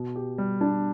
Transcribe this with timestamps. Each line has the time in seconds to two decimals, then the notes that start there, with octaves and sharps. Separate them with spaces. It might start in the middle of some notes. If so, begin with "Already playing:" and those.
Already playing: B2
0.16 G4
0.38 G3
0.61 D4